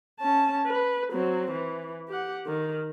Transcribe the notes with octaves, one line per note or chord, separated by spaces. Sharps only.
C#4 A5
B4
F#3 C4
E3
G4 F#5
D#3